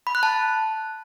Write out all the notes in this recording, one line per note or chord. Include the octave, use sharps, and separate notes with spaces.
B5
F#6
A5